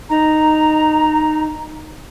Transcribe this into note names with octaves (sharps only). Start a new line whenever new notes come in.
D#4 A#5